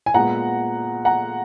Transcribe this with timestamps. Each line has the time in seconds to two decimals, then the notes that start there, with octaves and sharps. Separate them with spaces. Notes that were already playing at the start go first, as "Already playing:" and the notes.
0.06 G#5
0.14 A#2 G#3 B3 F#5 A#5
1.05 F#5 A#5